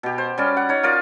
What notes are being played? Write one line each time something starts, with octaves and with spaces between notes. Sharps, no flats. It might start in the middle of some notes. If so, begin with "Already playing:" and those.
B2 G4
C5
G3 C#4 D5
F#5
D#4 C#5
F4 A#4 D5